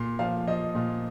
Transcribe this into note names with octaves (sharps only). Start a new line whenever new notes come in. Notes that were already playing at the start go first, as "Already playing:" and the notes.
Already playing: A#2 C6
F3 F5
F3 D#5
A#2